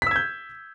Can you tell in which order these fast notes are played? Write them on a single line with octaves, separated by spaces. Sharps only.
B6 E6 G#6 G6